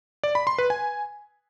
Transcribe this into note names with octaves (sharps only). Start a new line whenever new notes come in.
D5
B5
C6
B4
G#5